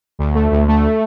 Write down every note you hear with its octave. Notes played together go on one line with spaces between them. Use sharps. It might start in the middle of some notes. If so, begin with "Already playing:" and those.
D2
A3
D2
A3